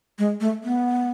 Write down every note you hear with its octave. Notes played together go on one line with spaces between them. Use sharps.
G#3
A3
B3